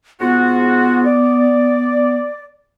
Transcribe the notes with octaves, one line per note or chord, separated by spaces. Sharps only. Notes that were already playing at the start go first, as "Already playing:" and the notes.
G#2 B3 F4 F#4
D5